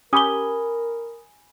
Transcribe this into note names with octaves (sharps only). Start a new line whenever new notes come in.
C#4 G4 A#4 G#5 B5 D#6 G7